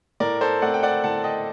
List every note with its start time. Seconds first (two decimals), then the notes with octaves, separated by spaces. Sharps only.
0.20 A2 A#4 D5
0.41 A4 C5
0.62 A3 C4 D5 F#5
0.74 G5
0.83 D5 F#5
1.04 A2 F#5 A5
1.24 D#5 G5